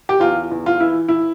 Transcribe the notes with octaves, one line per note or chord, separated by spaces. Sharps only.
G4
E2 F4
E2
F4
E3 E4
E4